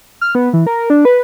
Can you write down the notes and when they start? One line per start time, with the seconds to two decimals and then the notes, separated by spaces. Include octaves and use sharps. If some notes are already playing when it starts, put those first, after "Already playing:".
0.21 F6
0.35 B3
0.53 E3
0.67 A#4
0.90 D4
1.05 B4